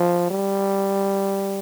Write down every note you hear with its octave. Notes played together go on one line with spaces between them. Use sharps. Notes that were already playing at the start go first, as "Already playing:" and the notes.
Already playing: F3
G3